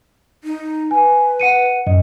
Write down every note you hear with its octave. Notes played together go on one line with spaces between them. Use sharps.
D#4
B4 G#5
F#5 C#7 D#7
F#2 D#5